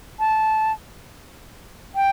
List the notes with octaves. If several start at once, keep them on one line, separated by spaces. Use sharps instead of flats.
A5
G5